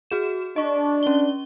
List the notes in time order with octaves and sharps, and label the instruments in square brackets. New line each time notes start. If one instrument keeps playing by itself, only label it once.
[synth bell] F#4 G#4 E7
[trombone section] D4 [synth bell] D#5 C#6
[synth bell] C#4 G7